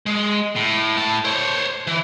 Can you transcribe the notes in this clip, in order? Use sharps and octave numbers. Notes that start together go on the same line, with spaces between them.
G#3
A2
A2 A5
C5 C#5
E3